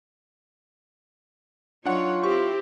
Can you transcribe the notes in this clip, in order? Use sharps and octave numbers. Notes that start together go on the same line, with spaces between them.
F#3 D4 D#4 F4 C#5 F#5
C4 E4 G4 C#6